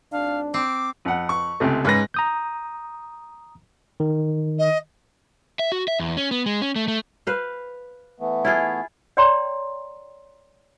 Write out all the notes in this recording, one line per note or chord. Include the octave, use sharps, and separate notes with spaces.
G#1 D4 F5
C4 D6
F2 F#5
C#6
C#2 C3 A3
G#2 C#4 B4 A#6
A#5 D#6 G6
D#3
D#5
E5
F#4
E5
E2
C#4
B3
G#3
C#4
A3
A3
B4 C5 F5
E3 A3 B3
E4 F4 G#4
C#5 D5 G5 A#5 C6